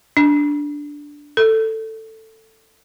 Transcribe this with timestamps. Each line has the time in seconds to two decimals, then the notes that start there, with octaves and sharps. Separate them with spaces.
0.17 D4
1.37 A4